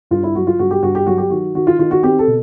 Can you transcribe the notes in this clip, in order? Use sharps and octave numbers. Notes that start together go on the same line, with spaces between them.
G2 F4
E4
F#3 F#4
F4
G2 F#4
G4
G2 F#4
G4
F#3 F#4
G4
D#3 F#4
D#3 F#4
F4
D#3 F4
F#4
C4 G4
A4
B2